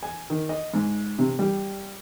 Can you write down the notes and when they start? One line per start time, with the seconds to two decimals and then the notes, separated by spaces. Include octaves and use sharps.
0.03 G#5
0.30 D#3
0.49 D#5
0.74 G#2
1.19 C3
1.39 G3